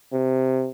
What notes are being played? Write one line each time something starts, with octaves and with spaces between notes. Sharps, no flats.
C3